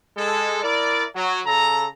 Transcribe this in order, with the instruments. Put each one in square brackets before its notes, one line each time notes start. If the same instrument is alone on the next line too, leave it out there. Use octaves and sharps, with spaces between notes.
[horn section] G#3 A4
E4 A#4 D5
F#3
C#3 A4 A#5